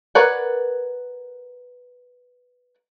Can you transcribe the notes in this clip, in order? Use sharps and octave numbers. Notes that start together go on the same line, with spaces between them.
A#4 B4 C#5 D5 F#5